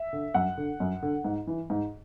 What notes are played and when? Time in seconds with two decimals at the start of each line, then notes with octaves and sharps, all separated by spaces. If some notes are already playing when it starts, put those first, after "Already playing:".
Already playing: E5
0.13 D3
0.34 F#2 F#5
0.57 D3
0.80 F#2
1.03 D3
1.25 G#2
1.47 E3
1.70 G#2